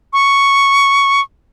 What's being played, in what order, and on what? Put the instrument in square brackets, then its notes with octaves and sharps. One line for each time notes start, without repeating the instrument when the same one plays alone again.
[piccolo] C#6